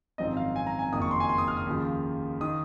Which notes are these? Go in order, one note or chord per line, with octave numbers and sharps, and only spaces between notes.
G#1 F#2 F3 C4 D#4 D#5
F5
G#5
A#5
G#5
F#1 F2 D#3 A#3 D#6
C#6
C6
G#5
C6
D#6
F6
D#6
D#2 C#3 F3
D#3 D#6